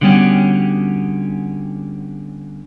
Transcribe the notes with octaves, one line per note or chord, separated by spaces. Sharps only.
D3 F#3 G3 B3 C#4 G4